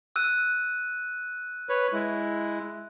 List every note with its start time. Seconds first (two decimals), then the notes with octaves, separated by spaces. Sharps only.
0.16 E6 F#6 D#7
1.69 B4 C#5
1.93 G#3 E4